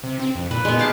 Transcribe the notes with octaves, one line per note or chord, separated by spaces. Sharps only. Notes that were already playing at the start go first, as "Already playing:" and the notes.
C3
C4
F2
A#2 B4
A#2 G#3 B3
G4 F5 A5